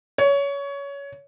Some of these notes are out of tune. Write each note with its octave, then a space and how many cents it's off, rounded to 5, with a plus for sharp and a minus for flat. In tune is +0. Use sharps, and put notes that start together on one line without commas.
C#5 +20